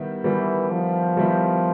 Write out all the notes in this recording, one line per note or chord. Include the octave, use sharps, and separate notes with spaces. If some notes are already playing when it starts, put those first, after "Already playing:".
Already playing: D#3 G3 B3 E4
D#3 E3 G3 B3 E4
F3
D#3 G3 B3 E4